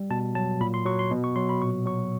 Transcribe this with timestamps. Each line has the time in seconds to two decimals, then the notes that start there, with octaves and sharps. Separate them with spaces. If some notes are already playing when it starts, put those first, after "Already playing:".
Already playing: G3
0.10 B2 A5
0.35 F#3 A5
0.61 A#2 B5
0.74 C6
0.85 F#3 C#6
0.99 C6
1.11 B2
1.24 C#6
1.36 F#3 C6
1.49 B5
1.62 A#2 C#6
1.86 F#3 C#6